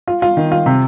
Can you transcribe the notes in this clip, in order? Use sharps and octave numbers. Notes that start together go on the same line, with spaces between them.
F4
F4
D#3
F4
C3